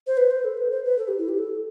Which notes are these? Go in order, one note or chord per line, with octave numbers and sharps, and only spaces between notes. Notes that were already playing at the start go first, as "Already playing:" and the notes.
C5
B4
C5
A4
B4
C5
B4
A4
G4
E4
G4
A4